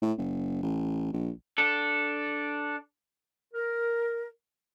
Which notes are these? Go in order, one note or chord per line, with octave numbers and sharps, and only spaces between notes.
A2
F#1
A1
A#1
D4 A4
A#4